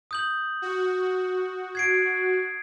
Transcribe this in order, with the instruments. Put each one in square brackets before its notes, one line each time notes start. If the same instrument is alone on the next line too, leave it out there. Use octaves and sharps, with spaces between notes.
[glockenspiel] D#6 G6 F#7
[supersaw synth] F#4
[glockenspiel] G#6 C7 D7